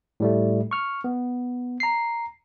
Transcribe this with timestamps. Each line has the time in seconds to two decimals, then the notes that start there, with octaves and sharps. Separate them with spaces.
0.20 A2 G3 A3
0.71 C#6 F6
1.04 B3
1.80 A#5 C7